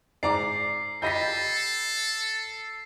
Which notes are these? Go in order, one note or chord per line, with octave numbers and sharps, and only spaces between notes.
G#2 D5 A#5 D6 C7
G4 A4 D#5 B5 G6 A#6 B6